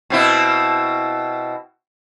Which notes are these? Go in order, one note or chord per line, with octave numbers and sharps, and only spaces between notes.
B2 C4 E4